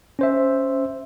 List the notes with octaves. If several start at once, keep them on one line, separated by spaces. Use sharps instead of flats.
C#4 C5 E5